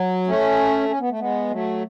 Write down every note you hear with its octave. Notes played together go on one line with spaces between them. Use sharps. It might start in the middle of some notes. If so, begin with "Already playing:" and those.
Already playing: F#3
A3 C#4
C#4
B3
A3
G#3 B3
F#3 A3